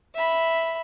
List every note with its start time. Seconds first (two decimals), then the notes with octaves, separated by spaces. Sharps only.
0.15 E5 B5